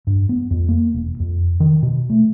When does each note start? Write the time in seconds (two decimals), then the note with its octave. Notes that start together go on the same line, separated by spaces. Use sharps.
0.07 G2
0.29 B3
0.51 F2
0.69 A#3
0.94 E1
1.20 F2
1.60 D#3
1.83 B2
2.10 A3